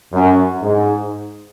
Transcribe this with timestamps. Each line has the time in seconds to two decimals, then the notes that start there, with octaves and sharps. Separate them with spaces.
0.12 F#2
0.62 G#2